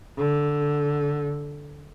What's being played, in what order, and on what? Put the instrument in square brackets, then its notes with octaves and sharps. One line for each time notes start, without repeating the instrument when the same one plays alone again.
[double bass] D3